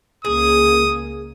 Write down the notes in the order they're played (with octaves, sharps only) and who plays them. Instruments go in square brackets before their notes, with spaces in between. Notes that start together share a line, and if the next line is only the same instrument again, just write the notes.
[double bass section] C#2 A#3 [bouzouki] G#4 [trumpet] D#6